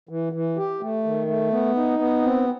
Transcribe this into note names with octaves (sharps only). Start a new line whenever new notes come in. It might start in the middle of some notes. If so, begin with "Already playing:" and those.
E3
E3
G4
A3
D#3
A3
B3
D#4
B3
C4